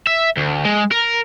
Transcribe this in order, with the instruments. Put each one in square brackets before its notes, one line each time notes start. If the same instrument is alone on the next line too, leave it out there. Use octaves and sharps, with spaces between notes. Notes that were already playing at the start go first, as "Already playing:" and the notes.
[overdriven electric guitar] E5
D2
G#3
A#4